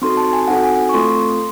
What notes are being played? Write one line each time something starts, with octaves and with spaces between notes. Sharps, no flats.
C4 D#4 F#4 A4 C6
A5
G#5
C4 D#4 F#4 A4 F#5
G#5
C#6
A3 C4 F4 A4 C6